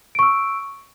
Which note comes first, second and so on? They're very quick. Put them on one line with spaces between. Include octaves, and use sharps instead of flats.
D7 C#6 E6